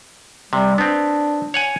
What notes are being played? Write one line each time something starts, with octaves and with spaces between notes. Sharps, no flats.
C3 G3
B3 C4 D4
C#5 F#5 G#5